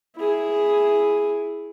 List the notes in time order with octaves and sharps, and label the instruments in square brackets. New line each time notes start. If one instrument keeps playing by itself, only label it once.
[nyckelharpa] E4 G#4